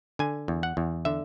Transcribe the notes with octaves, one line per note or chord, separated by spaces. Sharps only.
D3 G#5
E2
F#5
E2
D3 E5